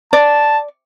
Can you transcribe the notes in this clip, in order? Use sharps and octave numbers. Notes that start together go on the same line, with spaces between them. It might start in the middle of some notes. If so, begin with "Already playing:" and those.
D5 A5